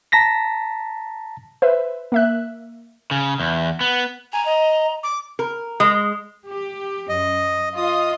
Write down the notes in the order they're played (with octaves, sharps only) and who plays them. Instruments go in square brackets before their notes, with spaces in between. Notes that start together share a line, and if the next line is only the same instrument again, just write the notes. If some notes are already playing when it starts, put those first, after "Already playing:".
[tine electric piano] A5 A#5 A#6 B6
[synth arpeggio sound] B4 C5 E5
A#3 E5 F#6
[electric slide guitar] C#3
E2
B3
[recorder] G#5 [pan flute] A#5
[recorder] D#5
D6
[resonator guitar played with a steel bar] A#4
G#3
[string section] G4
[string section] F#2 [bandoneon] D#5
[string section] F4 D#5 [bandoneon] D#6